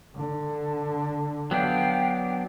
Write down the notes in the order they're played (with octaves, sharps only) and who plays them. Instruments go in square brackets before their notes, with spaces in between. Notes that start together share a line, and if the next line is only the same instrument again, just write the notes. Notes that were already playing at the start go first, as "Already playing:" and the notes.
[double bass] D3
[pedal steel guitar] F#3 B3 D4 [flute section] F5 G5